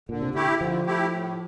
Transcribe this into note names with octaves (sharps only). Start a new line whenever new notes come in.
A#2 D3
C3
D3 A3 E4 G4
D3 F3
A3 E4 G4
A2